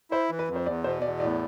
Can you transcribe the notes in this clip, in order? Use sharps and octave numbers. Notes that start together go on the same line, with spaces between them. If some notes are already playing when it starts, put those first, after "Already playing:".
E4 C5
E3
B4
F2
C5
E2 D5
B2 C5
E2 D5
A2 D5